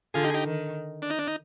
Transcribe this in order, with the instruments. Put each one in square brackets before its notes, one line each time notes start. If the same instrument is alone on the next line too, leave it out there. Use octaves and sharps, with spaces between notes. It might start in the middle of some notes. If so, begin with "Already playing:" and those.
[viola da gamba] D3 [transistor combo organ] F4 G#4
[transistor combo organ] D#4 G4
G#4
D#4 G4
[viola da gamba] D#3
[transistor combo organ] D4
D#4
D4
D#4